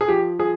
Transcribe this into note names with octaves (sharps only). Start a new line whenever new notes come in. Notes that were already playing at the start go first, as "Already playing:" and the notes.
G#4
F3 G4
F3 G#4